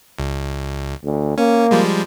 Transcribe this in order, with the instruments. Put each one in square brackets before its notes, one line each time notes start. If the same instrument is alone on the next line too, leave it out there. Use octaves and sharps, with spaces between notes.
[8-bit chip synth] C#2
[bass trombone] D2
[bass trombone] A#3 [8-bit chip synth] C#4
[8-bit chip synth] F3 G3 G#3